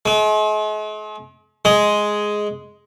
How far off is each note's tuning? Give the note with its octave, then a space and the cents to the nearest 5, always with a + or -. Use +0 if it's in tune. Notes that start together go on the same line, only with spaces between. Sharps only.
G#3 +45
G#3 +5